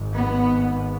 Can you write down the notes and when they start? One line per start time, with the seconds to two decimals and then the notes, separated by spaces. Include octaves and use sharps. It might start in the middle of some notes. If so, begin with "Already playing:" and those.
Already playing: G#1 G#2
0.16 B3